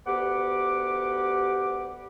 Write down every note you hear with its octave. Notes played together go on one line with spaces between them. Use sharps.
D2 B3 G4 F#5 D6